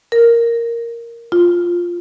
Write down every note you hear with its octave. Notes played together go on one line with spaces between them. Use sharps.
A#4
F4